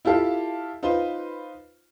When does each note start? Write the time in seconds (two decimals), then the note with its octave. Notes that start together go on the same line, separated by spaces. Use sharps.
0.05 E4 F4 G4 A4 F5
0.83 D#4 F4 B4 C5